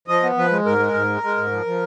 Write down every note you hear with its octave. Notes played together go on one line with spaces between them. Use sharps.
F3 D#5
B3
F3 B4
G#3
G#2 A#4
G#3
G#2
G#3
G#3
G#2
F3
F3